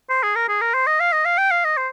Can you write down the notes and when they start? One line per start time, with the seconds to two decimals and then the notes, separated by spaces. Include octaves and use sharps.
0.10 C5
0.23 G#4
0.36 A#4
0.49 G#4
0.61 A#4
0.74 C5
0.87 D#5
1.00 F5
1.12 D#5
1.25 F5
1.38 G5
1.51 F5
1.64 D#5
1.77 C5